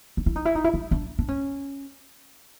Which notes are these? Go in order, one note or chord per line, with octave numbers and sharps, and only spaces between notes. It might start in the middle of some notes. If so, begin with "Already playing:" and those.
D#4
E4
D#4
E4
D#4
E4
D#4
D4
D4
C#4